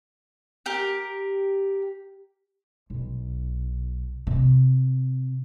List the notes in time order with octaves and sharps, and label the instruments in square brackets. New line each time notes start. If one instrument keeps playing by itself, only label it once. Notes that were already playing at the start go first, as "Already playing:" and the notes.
[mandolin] G4 A#4
[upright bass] B1
C3